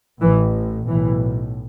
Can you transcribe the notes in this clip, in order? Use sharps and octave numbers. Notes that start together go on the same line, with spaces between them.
A1 A2 E3
B1 A2 E3